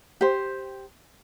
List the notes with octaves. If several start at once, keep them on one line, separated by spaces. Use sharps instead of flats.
G4 C5